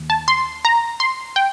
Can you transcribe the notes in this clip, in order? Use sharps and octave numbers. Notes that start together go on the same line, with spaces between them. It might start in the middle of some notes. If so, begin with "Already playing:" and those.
Already playing: D#2
A5
C6
A#5
C6
G5